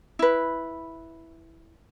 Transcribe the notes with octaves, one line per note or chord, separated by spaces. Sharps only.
E4 B4